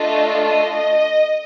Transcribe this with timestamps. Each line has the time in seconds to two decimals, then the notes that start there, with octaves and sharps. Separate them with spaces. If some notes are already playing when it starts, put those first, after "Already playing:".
Already playing: A3 D4 F4 A4 D#5
0.44 D#5